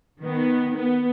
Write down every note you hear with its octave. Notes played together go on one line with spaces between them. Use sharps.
D#3 B3
B3